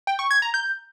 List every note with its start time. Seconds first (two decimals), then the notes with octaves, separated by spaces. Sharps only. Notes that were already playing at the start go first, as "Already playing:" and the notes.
0.07 G5
0.19 C#6
0.31 G#6
0.42 A#5
0.54 G6